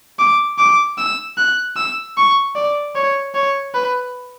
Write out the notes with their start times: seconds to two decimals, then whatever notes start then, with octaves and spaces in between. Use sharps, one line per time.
0.19 D6
0.58 D6
0.98 E6
1.37 F#6
1.76 E6
2.17 C#6
2.56 D5
2.95 C#5
3.35 C#5
3.74 B4